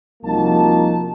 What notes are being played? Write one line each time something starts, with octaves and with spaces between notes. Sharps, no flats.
C2 F3 A#3 D#4 F#4 A5